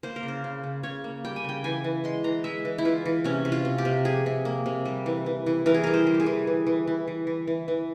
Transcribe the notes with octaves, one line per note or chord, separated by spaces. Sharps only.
A#3 C5
A#4
C#3
C5
C#3
C#3
C#3 C#5
A#3
G3 G5
G#5
C#3 G5
E3 G#5
E3
G#3 C6
E3 A#5
G#3 E5
E3
E4
E3 F4
E3
C3 C#4
C3
F4
C3
G4
C3
F3 G#4
C3
A#3
C3
G3
E3
E3
E3
E3 A#4
G#4
G3 A#4
C5
G3
G4
G#4
E3
E3
E3
E3
E3
E3
E3
E3